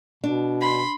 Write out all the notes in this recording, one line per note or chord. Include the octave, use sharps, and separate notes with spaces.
B2 D4
B5 C6